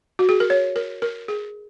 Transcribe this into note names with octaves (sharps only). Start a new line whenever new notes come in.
F#4
G#4
A#4
C#5
A#4
A#4
G#4